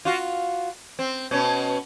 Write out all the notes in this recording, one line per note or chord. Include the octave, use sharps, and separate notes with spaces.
F4 F#4
C4
B2 C#4